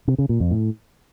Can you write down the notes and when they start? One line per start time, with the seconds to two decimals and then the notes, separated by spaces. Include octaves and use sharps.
0.08 C3
0.18 C#3
0.29 A#2
0.40 F2
0.51 A2